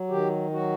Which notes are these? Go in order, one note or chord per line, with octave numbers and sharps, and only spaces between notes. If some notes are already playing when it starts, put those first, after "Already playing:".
Already playing: F#3
D#3 G4
F#3 F#4